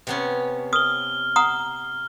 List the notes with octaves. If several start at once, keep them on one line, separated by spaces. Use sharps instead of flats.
C3 B3 C#4
D#6 F6 G7
F#5 A#5 D#6